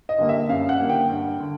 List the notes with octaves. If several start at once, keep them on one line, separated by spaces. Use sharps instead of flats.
D#5
D3 G3 A#3
E5
F#2 F5
F#5
D3 G3 A#3
G5
G2
D3